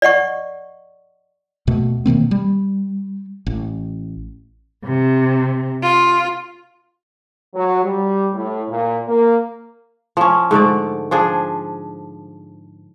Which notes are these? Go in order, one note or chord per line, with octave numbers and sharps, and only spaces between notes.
D5 D#5 F#5 C#6
D#2 B2 A3
B2 D#3 A#3 C4
G3
A1
C3
F4
F#3
G3
A2
A#2
A#3
F3 C#4
G#2 D3 A3 D5
F3 D4 G#4